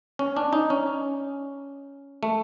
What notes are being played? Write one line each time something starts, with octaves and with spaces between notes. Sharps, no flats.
C#4
D4
D#4
C#4
A3